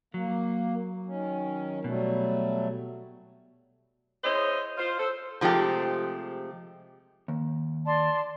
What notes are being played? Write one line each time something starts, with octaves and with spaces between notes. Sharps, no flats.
F#3 A#3
D#3 C#4
B2 F#3 G3 A3
E4 G#4 C5 C#5 D#5
F4 C5
A4 C5
C3 F3 G#3 A3 G4
D#2
D5 A5 C6